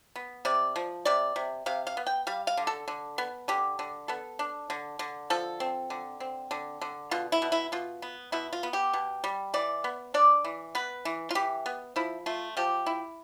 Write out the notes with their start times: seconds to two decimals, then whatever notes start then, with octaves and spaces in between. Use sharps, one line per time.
0.16 B3
0.45 C3 D5
0.76 F3
1.05 C3 D5
1.36 C3
1.66 C3 F5
1.87 F5
1.97 B3
2.07 G5
2.27 G3 F5
2.47 F5
2.57 D3
2.67 A4
2.88 D3
3.18 B3
3.48 D3 G4
3.79 D3
4.08 B3 A4
4.39 D4
4.70 D3
4.99 D3
5.30 F3 A4
5.60 C4
5.90 D3
6.20 C4
6.51 D3
6.81 D3
7.11 B2 F4
7.32 E4
7.42 B2
7.52 E4
7.72 B2 F4
8.02 B3
8.32 B2 E4
8.53 F4
8.63 B3
8.73 G4
8.93 B2
9.24 G3
9.54 E3 D5
9.84 B3
10.14 D4 D5
10.44 E3
10.75 B3 B4
11.05 E3
11.31 F4
11.35 E3 G4
11.66 B3
11.96 F3 E4
12.26 A3 F4
12.57 F3 G4
12.86 E4